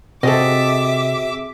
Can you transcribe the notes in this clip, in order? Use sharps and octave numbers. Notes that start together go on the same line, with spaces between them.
C3 C4 F#4 G#4 A4 D#5 E5 D6